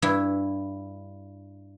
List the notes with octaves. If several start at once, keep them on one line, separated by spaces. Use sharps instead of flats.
G2 E4